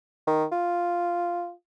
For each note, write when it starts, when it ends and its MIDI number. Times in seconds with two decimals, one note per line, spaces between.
0.27 0.45 51
0.52 1.51 65